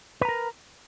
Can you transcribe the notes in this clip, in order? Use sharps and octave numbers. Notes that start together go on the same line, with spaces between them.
A#4 B4 A#5